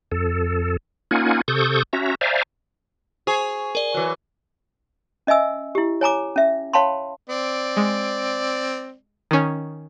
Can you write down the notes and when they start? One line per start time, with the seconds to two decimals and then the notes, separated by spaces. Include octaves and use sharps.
0.12 F2 A4
1.11 A#3 C#4 D#4 F4 F#5 G#5
1.48 C3 A4 C#6 D#6 G6
1.93 C#4 F#4 E5 A#5
2.21 C5 D5 E5 F5 G#5 A#5
3.27 G#4 C5 C#6
3.75 A#4 D5
3.94 E3 F#3
5.27 C#4 D#5 E5 G#5 E6
5.75 E4 G4
6.01 C#5 G#5 A#5 D6
6.36 C#4 E5
6.73 C#5 F5 G5 A5 B5 C6
7.29 C4 D5
7.77 G#3
9.31 D#3 C#4